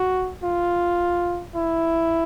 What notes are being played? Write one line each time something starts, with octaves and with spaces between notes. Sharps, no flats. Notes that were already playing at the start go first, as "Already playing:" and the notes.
Already playing: F#4
F4
E4